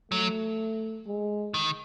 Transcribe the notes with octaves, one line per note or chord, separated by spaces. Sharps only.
F#3 A3
G#3
D#3